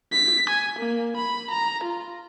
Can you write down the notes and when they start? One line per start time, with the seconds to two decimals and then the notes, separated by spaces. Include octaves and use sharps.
0.12 B6
0.50 G#5
0.79 A#3
1.17 B5
1.51 A#5
1.84 F4